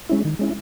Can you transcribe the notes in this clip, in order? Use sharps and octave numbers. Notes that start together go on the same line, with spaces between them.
G#3 C#4 E4
D#3
G#3 C#4 E4